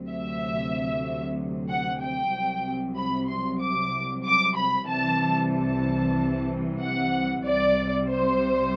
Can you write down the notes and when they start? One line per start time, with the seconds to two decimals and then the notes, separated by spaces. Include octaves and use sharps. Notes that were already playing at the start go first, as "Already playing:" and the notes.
Already playing: D2 C3 F#3
0.10 E5
1.70 F#5
2.01 G5
2.33 C2 C3 F#3
2.97 B5
3.29 C6
3.62 D6
4.25 D6
4.57 B5
4.89 C2 C3 E3 G3 A5
5.53 A5
6.81 F#5
7.45 C2 C3 G3 D5
8.09 C5